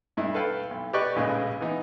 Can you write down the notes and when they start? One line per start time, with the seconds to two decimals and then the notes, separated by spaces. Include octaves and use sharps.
0.17 B1 G2 D#4 E4
0.34 A4 B4 F5 G5
0.71 B1
0.93 G4 B4 D5 D#5 C#6 F#6
1.16 A#1 A2 C#3 G#3 B4 D#5
1.60 E3 B3 D#4 E4